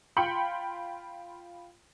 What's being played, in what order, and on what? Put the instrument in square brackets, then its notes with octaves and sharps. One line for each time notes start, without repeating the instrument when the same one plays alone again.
[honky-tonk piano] F4 G5 B5 C6 C#7 F#7